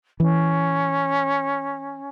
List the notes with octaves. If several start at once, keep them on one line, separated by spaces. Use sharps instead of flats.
E3 C#4